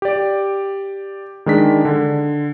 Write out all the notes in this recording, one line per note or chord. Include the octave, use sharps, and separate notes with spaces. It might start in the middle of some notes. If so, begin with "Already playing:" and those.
G4 D5
D#3 G#3 D4 B6
D3